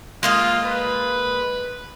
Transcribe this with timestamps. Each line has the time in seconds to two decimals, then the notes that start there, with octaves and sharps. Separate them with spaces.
0.23 G#3 A#3 F4 D#5
0.66 B4